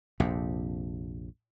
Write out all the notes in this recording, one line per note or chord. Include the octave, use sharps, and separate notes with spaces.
A#1 F2 C3